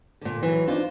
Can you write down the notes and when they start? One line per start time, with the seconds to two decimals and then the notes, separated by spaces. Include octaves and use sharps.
0.21 A#2 D3
0.43 E3 F#3
0.67 D4 D#4 F4 C5